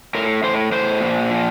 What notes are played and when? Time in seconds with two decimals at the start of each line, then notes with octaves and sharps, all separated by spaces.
0.15 A2 A#4
0.43 A2 C5
0.72 A2 C5
1.01 A#2
1.30 F3